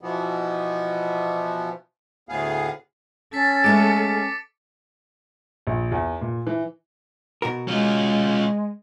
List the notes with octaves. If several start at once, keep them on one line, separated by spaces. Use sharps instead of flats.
B2 E3 F3 B3
D2 A2 B3 G#4 F5
C#4 A4 A6 B6
G#3 A3 B4 D6 C#7 D7
A#1
E2
A#2
E3
B2 F#4 A#4
G#3 C#4 F4